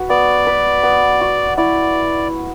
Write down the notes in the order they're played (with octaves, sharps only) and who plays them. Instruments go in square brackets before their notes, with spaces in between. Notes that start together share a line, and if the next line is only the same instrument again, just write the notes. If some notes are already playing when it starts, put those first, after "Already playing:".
Already playing: [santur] F#4 B4
[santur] B3 [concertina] D5
[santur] B4
B3
F#4
[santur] E4 [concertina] D5